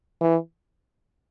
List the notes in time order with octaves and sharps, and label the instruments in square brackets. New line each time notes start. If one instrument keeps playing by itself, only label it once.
[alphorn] E3